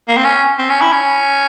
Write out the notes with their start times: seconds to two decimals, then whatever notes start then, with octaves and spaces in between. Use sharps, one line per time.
0.08 A#3
0.17 C4
0.24 C#4
0.58 C4
0.70 C#4
0.81 E4
0.93 C#4